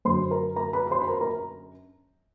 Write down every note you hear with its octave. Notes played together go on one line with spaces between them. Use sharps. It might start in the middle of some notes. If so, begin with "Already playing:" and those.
F#2 D3 F#3 C5 C6
A#4 A#5
A#4 A#5
B4 B5
B5
C5 C6
B5
A#4 A#5
A#4 A#5